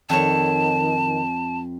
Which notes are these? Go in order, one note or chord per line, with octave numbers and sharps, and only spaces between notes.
F2 D#3 C#5 A5